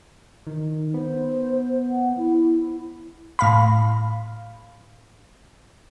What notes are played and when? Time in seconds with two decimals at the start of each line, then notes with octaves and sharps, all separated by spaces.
0.47 D#3
0.94 B3 C5
1.90 F#5
2.17 E4
3.39 A2 F5 B5